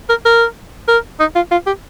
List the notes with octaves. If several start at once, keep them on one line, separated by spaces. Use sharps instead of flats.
A#4
A#4
A#4
D#4
F4
F4
G4